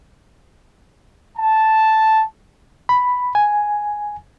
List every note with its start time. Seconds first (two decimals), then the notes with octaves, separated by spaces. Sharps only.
1.38 A5
2.89 B5
3.35 G#5